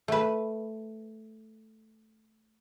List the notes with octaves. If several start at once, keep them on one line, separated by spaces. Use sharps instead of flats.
A3 B4